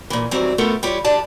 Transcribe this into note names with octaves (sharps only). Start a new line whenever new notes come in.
A#2 E3
D#3 E3 F#3 G3 C4
A3 B3 F4 A4 A#4
G3 E4 F4 G4 C#5
E3 G3 D4 D5 A5